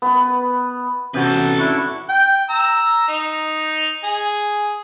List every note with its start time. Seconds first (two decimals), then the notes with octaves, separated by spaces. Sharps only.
0.02 B3 B4
1.14 E2 C3 C4 C#4 F#4 A4 B4
1.34 F#5
1.59 D4 E4 C#6
2.09 G5
2.50 A#5 E6
3.08 D#4
4.04 G#4